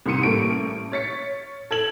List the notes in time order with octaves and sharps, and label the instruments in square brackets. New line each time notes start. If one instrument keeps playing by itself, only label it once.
[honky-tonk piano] C2 D#3 C6 C#7 D#7
A1 G3 A#3 A4 C#6 D7
C#5 C#6 A6 B6 C#7
A4 G#6 E7 F#7